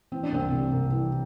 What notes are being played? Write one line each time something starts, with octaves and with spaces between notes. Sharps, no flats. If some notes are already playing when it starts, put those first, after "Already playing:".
E3 C4
D4
C2 C4
C3
C2
E3